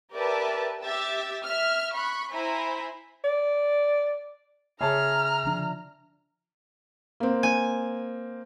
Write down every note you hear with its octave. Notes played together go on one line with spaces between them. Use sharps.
G4 A#4 B4 D5 E5 A5
G4 E5 E6 A6
E5 F6
B5 C#6 F#6
E4 C5 E5 G#5 A#5 B5
D5
C#3 G#4 C#5 E5 A5 A#5 F6
D3 F3 D4
A#3 C4
G#5